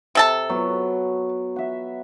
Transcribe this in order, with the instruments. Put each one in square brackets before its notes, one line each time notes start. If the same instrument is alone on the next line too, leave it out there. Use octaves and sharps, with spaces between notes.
[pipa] C3 A4 A5
[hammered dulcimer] F#3 B3
E5 F#5